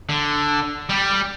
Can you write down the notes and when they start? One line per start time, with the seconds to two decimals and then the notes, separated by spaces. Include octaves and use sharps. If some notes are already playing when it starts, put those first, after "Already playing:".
0.09 D3
0.89 G3 G4